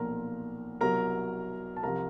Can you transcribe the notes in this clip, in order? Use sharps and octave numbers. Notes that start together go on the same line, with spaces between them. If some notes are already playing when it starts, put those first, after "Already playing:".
Already playing: B1 A#2 F3 A#4 A#5
C2 B2 F#3 A#4 A#5
A5
C2 C3 F3 A#4 A#5